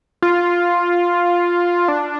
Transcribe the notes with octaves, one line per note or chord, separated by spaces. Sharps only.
F4
D4